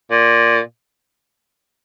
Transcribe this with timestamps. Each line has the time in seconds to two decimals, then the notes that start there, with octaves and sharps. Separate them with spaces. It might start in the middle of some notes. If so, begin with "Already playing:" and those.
0.11 A#2